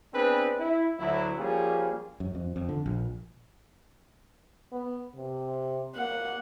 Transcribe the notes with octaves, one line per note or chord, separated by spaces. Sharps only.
B3 C4 D4 G#4 B4
E4
D2 F#3 E4
F3 G3 A#3 C#4 F4 G#4
F#2
F2
F2
D3
A#1
B3
C3
A#3 F#5